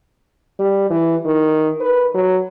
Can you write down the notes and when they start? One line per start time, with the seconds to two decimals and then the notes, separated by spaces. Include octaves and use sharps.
0.59 G3
0.90 E3
1.25 D#3
1.80 B4
2.14 F#3